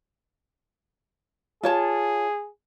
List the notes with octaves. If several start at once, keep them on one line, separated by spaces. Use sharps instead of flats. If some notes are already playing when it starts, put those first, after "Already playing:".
F4 G#4 C#5 A5